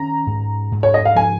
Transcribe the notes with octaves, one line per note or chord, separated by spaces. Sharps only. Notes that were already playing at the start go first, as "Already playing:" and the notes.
Already playing: D#3 C#4 A#5
G#2
G#2
C#5
D#5
F5
F3 G#5